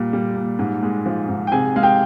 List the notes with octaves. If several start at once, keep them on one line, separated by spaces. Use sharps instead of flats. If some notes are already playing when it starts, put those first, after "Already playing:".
Already playing: A#2 G3
G3
A#2
G#2
G#3
F3
G#2
G5
C3 G#4 G#5
G#3 F5
G4 G5